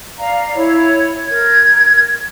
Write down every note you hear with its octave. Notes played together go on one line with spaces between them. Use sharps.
D5 F5 A#5
E4 C#5
A#4 G#6